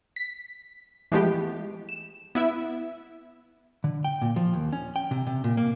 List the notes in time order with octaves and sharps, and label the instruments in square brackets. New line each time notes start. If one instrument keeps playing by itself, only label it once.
[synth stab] B6
E3 F3 G#3 A3 B3 G4
E7
B3 E4 E5
[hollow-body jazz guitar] D3
G5
A#2
F3
D#2
C#4
G5
C3
C3
A#2
A#3